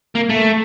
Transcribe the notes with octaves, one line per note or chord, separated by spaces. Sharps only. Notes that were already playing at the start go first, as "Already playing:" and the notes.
A#3
A3